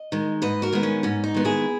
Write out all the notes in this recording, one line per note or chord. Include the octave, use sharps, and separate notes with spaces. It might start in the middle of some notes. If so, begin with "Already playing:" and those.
Already playing: D#5
D#3 G#3
G#2 B4 D#5
F#4 A#4
D#3 G#3 B3
C#4
G#2 C#4
D#4
D#3 G#3 B3
E4 G#4